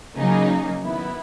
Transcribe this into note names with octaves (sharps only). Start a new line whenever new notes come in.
C#3 F#3 A#3 D#4 G#4
D#3 F#3 B3 E4